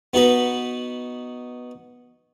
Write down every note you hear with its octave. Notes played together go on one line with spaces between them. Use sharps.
B3 D#4 F#4 B4